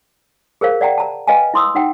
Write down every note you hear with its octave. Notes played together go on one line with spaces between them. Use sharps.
G#4 A#4 C5 F5
D5 F#5 G5 A#5
A5 A#5
B4 D#5 F5 G5 G#5
E4 C6 D#6 E6
D#4 F#5 G5